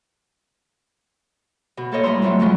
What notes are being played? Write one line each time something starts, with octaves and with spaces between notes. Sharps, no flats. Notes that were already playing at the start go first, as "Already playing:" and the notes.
B2
A#3 A4 C5 C#5 D#5
A2 G3 E4 A#5 C6
F#3 A3 B3 C4 F4
F2 C#3 F3 F#3 G#3 B3